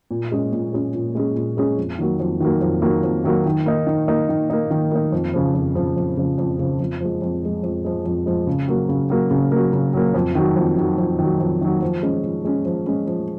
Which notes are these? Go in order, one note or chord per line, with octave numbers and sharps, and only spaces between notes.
A#2
G#3 C#4 G#4
A#2
G#3 C#4 G#4
A#2
G#3 C#4 G#4
A#2
G#3 C#4 G#4
F2
D#3 F#3 A#3
F2
D#3 F#3 A#3
F2
D#3 F#3 A#3
F2
D#3 F#3 A#3
D#3
A#3 D#4
D#3
A#3 D#4
D#3
A#3 D#4
D#3
A#3 D#4
F2
C#3 F3
F2
C#3 F3
F2
C#3 F3
F2
C#3 F3
F2
F3 G#3
F2
F3 G#3
F2
F3 G#3
F2
F3 G#3
C#3
F#3 A#3
C#3
F#3 A#3
C#3
F#3 A#3
C#3
F#3 A#3
F2
D#3 F#3
F2
D#3 F#3
F2
D#3 F#3
F2
D#3 F#3
F3
G#3 C#4
F3
G#3 C#4
F3
G#3 C#4
F3